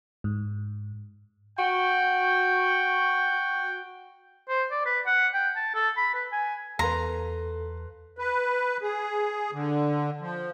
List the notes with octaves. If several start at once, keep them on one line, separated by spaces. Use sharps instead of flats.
G#2
F#4 G5
C5
D5
B4
F#5
G5
A5
A4
B5
B4
G#5
E2 A4 B4 F5 A#5 C6
B4
G#4
D3
F3